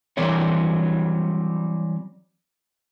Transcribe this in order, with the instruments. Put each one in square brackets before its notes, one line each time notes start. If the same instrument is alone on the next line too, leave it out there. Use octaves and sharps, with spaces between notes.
[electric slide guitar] E3 F#3 G3 C4 C#5